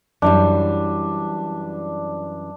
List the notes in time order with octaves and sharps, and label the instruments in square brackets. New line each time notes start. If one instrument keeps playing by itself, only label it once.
[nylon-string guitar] F#2 E3 G3 [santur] D4